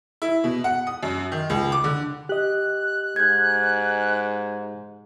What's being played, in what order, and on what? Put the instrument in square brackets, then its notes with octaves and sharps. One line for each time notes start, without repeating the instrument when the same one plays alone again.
[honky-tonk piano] E4
B2
F#5
D#6
F#2
D#3
C#2
D6
D3
[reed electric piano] G4 D#5 [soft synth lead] F#6
[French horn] G#2 [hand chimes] G6 G#6